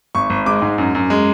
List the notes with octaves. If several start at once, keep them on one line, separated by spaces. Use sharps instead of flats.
G#1 C#6
G#1
G#3 D6
G#2
F#2
F#2
G#3